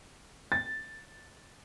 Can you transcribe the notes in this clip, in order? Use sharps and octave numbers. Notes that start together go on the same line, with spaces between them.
A6